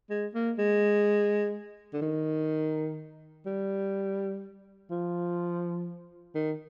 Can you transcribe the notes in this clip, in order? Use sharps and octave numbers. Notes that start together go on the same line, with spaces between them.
G#3
A#3
G#3
D3
D#3
G3
F3
D#3